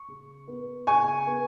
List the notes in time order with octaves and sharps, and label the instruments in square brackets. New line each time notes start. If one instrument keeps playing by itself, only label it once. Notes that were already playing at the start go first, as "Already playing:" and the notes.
Already playing: [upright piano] C#6
C#3
B3
C#3 G#5 C#6
B3